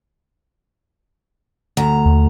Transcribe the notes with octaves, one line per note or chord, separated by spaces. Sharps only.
D2 A#5
D#2